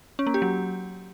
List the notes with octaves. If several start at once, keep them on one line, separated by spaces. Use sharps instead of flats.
C#4
A#3
G4
F#3